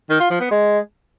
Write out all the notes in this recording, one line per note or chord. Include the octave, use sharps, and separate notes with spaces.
D#3
F4
F3
B3
G#3